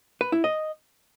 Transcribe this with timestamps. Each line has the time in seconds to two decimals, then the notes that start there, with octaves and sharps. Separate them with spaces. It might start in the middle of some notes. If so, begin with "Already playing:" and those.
0.21 B4
0.32 E4
0.44 D#5